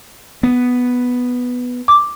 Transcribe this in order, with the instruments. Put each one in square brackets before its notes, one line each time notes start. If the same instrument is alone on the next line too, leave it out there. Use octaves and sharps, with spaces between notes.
[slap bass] B3
[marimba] D6